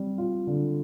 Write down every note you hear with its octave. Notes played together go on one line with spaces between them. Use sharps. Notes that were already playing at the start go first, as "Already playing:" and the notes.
Already playing: G3 C4
F4
D3